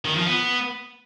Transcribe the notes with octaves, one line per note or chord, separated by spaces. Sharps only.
D#3
F3
B3